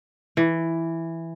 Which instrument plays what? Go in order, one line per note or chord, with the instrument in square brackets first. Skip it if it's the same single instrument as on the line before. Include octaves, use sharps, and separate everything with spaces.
[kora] E3